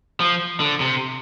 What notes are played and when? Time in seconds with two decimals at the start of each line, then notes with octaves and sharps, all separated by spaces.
0.20 F3
0.60 D3
0.80 C3